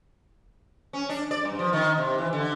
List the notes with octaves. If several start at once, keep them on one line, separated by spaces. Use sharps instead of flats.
C#4
D4
D5
G2
F3
D#3
C3
E3
D3